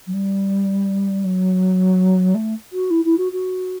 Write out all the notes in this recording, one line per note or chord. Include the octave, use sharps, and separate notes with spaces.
F#3
G3
F#3
A3
F#4
E4
E4
F#4
F#4